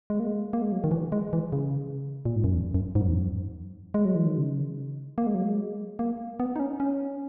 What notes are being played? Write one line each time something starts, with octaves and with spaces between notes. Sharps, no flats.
G#3
A#3
G#3
A#3
G#3
F#3
D#3
E3
G#3
E3
C#3
A#2
G#2
F#2
E2
F#2
G#2
F#2
E2
F#2
G#3
F#3
E3
D#3
C#3
A#3
G#3
F#3
G#3
A#3
B3
D#4
C#4
C#4